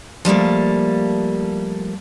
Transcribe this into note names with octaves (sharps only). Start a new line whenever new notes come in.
F3 G3 A3 A#3